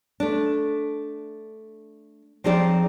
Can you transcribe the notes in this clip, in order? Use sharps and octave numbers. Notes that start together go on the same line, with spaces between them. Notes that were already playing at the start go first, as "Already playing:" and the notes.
A3 D4
F3 C4 D#4 G#4 C5 D5